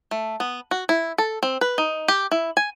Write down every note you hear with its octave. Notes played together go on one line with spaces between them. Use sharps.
A3
B3
F#4
E4
A4
C4
B4
D#4
G4
E4
G#5